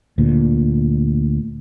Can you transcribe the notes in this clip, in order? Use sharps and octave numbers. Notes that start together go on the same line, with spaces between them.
D2 A#2